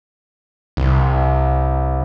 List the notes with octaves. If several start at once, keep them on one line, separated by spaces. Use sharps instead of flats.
C2